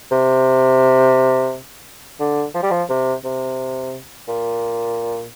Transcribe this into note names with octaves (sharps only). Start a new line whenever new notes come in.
C3
D3
F3
G3
F3
C3
C3
A#2